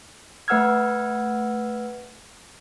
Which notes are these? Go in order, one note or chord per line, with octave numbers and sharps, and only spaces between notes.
A3 B4 F#5 E6 F6 G#6